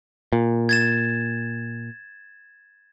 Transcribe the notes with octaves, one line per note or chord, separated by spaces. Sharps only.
A#2
G#6 A6 E7